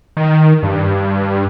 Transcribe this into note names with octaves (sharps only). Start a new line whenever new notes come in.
D#3
G2